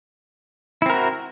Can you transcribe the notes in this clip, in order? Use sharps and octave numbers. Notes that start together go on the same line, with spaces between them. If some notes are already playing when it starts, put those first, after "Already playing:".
C4 E4 F#4 A#4